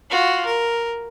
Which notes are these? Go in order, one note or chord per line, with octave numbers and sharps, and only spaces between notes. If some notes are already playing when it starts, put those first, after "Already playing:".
F4 F#4
A#4